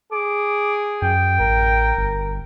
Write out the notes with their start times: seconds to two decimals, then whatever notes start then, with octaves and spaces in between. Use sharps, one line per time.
0.12 G#4 D6
1.02 F#2 G5
1.40 A1 A#4
1.97 G1